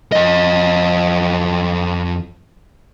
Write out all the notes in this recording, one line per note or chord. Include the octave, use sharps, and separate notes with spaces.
F2 D#5